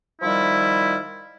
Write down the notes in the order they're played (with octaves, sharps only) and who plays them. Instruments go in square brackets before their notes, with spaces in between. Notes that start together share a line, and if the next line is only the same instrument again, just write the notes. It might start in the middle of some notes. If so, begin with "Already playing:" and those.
[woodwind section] D#3 F3 G3 E4